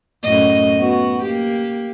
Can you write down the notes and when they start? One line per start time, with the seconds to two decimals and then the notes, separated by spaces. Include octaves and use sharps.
0.23 F#2 A2 D#5
0.78 B3 F#4
1.23 A#3 G4